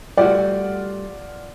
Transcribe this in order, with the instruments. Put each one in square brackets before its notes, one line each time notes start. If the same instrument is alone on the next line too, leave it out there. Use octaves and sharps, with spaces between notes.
[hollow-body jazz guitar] G3 A3 F#4 [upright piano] F4 D5 F#5